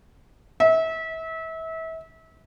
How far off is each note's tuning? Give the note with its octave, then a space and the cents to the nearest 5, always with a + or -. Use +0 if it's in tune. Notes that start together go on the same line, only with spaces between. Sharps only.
E5 -30